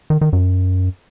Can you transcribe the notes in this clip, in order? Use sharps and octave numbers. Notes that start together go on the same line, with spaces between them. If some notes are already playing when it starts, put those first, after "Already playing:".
D#3
D#3
F#2